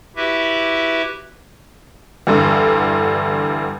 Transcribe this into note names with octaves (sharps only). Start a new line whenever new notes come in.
E4 F#4 G4 B4 E5
E2 G2 D3